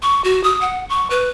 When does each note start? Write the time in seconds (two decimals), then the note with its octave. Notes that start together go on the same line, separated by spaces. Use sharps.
0.03 C#6
0.24 F#4
0.44 D#6
0.61 F#5
0.89 C#6
1.10 B4